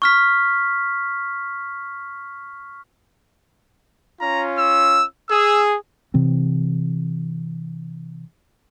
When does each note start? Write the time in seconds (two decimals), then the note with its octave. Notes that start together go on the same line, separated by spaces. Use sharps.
0.02 C#6 F6 B6
4.21 C#4 F4 A#5
4.58 E6
5.29 G#4 E6
6.14 C3 E3 C4